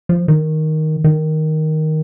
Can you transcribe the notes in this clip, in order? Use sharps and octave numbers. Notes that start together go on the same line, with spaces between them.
F3
D#3
D#3